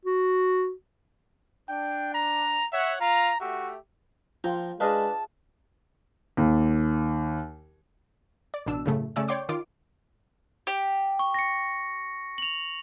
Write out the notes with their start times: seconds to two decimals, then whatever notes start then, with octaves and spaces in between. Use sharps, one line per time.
0.05 F#4
1.69 D4 G5
2.14 A#5
2.72 C#5 E5 F#5
3.01 F4 A#5
3.41 A3 F#4 G4 E5
4.44 F3 F4 G5 A#5
4.80 G#3 D4 G#4 B4 D#5 F5 A5
6.37 D#2
8.54 D5
8.66 A1 B2 D4 E6
8.86 F#2 A2 C#3 A3
9.16 C#3 A3 C#4 D5 E6
9.28 C#5 D5 G5 C6 D6 G6
9.49 D#3 F4 D6 D7
10.67 G4
11.19 C#6
11.34 A#6 C#7
12.38 F7 F#7